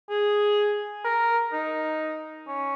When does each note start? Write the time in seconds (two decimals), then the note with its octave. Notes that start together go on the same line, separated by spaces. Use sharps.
0.10 G#4
1.05 A#4
1.53 D#4
2.48 C#4